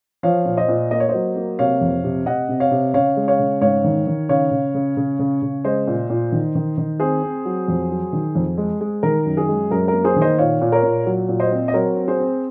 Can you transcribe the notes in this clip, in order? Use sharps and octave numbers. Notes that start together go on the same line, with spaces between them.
F3 C#5 F5
A#2
C5 D#5
A#2
A#3 D#5
C#5
C5 D#5
F#3
A#3
C3 C#5 F5
F2
C3
C3 D#5 F#5
C3
C#5 F5
C3
C#3 C#5 F5
G#3
C#5 F5
C#3
G#2 C#5 F5
D#3
D#3
C#3 C#5 F5
C#3
C#3
C#3
C#3
C#3
G#3 C5 D#5
A#2
A#2
D#3
D#3
D#3
C4 G#4 C5
C4
F#3
F2
F#3
D#3
F2
G#3
G#3
D#3 A#4
F#2
G#4
G#3
F#2 A#4
A#3 A#4
G#4 C5
D#3
C5 D#5
A#2 C#5 F5
A#2
A#4 C#5
A#2
F#3
A#2
C5 D#5
C4
D#5
F#3 A#4 C#5
C4
G#4 C5
C4